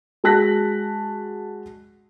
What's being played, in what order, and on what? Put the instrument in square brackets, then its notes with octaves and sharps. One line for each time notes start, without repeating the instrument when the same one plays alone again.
[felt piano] G#3 F#4 A5 F#6 A#6 B6